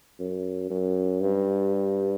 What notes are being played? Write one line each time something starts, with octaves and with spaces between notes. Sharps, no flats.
F#2
F#2
G2